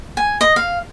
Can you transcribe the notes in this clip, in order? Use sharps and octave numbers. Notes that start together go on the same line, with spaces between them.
G#5
D#5
F5